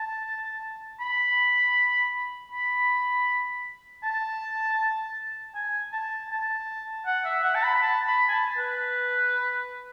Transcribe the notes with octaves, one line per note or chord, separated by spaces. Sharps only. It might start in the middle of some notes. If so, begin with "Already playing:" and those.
Already playing: A5
B5
B5
A5
G#5
A5
A5
F#5
E5
F#5
A5
B5
A5
B5
G#5
A5
B4